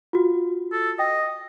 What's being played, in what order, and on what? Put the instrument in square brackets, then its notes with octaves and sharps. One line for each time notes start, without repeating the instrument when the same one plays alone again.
[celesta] F4 F#4
[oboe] A4
[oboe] D#5 [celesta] G5